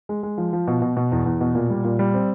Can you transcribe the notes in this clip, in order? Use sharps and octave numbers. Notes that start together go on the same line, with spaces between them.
G#3
G#3
F3
F3
B2
B2
B2
E2
E2
B2
A#2
G3
A#2
G3
C4